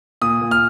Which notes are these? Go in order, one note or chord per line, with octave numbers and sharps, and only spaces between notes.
A#2 D#6
A#2
F6